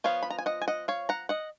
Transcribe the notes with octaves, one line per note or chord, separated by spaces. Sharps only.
F3 B3 F4 C#5 F5
B5
A#5
G#5
D#5 F#5
G#5
D#5 F#5
C#5 F5
F#5 A#5
D#5 F#5